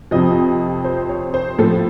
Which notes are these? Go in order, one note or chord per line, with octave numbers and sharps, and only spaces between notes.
F2 C3 F3 D#5
C5
C#5
C5
A2 F3 A4